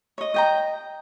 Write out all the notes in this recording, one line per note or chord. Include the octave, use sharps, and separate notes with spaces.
C#5 D#5
D#5 G5 A#5